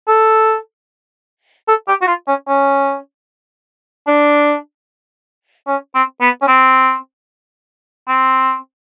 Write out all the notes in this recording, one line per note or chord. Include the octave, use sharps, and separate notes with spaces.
A4
A4
G4
F#4
F4
C#4
C#4
D4
C#4
C4
B3
C#4
C4
C4